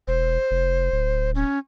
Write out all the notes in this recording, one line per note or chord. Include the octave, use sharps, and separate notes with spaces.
E1 C5
F1
D1
C#4